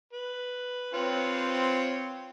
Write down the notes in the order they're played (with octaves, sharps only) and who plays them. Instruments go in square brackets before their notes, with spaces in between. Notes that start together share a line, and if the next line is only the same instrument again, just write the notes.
[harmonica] B4
[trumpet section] C4 [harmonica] F4 B4 C#5